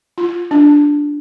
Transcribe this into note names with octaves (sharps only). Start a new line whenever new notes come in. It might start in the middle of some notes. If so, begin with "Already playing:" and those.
F4
D4